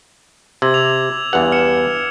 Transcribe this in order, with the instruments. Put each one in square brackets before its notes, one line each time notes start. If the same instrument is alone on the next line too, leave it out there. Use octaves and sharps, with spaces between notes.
[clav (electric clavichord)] C3 [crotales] E6 G#6 F#7
[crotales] D6 F7
[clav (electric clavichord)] E2 F#5 [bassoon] G2
[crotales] F6 C#7 E7